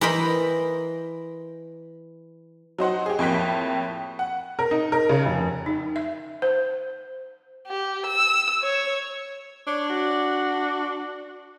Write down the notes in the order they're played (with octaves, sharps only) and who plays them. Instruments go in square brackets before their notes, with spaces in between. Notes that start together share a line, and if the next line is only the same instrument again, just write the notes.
[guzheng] E3 A#4 C5 D#5 B5
[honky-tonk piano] F#3 D#4 C5 F#5
G4 G#4
F2 A2 A#3 G5 F#6 B6
F#5
A#4
D#4
A#4
C#3
F1
[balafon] D#4
E5
C5
[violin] G4
E6
C#5
[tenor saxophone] D4 [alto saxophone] C#5
[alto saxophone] F#4